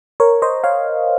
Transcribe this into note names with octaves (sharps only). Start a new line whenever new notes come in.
A#4 C#5
C5 D#5
C#5 F5